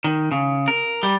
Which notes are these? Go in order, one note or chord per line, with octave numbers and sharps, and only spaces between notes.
D#3
C#3
A#4
G3